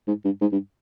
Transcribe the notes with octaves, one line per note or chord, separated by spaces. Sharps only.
G#2
G2
G#2
G2